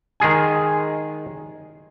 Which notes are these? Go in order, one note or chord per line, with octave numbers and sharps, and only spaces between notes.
D#3 G#3 G#4 G#5